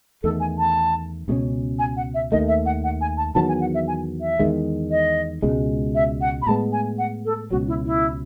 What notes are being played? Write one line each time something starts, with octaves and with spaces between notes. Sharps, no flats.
E2 D#3 A3 A4
G#5
A5
C#2 B2 G#3 C#4
G#5
F#5
E5
D#2 D#3 A3 D#5
E5
F#5
F#5
G#5
A5
E2 D#3 F#3 B3 A5
G#5
F#5
E5
G#5
E5
E2 D#3 G#3
D#5
C#2 B2 G#3
E5
F#5
B5
A2 G#3 B3 A5
G#5
F#5
A4
C#2 B2 F#3 F#4
E4
E4